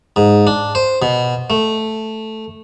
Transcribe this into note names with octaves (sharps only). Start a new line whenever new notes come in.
G#2
D4
C5
B2
A3